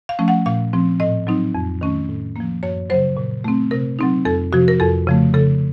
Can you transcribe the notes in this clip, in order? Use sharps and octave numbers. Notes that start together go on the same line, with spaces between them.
F5
F3 A3 C#4
F#5
A#2 F5
F3 C4
A2 D#5
F#3 C4 D#4
F2
D#3 A3 C#4
A2
F3 A#3
F#2 C#5
C#3 F#3 C5
A#2
A3 C4
C3 A#4
F#3 C4 D#4
F2 A4
C3 F3 F#4
A#4
F2 A4
C#3 F3 A3
C#3 A4